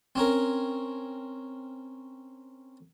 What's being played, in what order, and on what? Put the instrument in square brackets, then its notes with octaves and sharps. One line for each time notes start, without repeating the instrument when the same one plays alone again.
[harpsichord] C4 C#4 A#4